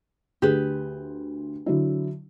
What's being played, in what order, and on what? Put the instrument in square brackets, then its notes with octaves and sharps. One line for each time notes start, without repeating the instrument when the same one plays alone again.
[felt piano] D2 [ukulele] G4 G#4 B4
[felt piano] D3 F#3 E4